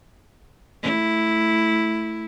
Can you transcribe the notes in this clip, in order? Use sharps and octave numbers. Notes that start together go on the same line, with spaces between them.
A3 E4